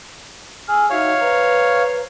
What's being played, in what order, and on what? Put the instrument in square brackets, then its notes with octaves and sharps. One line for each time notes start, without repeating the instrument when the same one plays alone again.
[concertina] G#4 [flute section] E6 F6
[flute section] D#4 F#4 E5 [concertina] C#5 F5
[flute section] B4 C5 A#5